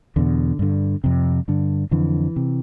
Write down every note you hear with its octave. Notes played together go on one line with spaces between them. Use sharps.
E2 B2 D3
G2 D3
F2 C3
G2 D3
F2 D3 E3
C3